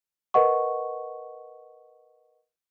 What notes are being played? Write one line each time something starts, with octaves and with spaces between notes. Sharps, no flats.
A#4 B4 D#5 F#5 C#6